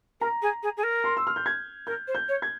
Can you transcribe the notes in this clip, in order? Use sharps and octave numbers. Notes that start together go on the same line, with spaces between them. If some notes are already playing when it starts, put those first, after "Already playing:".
A#4 A#5
G#4
G#4
G#4
A#4
C6
E6
F6
G6
G#6
A#4 G6
C5
G6
C#5
G#6